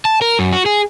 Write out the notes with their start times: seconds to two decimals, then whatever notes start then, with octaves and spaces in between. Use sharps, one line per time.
0.05 A5
0.21 A#4
0.39 F#2
0.53 F#4
0.66 G#4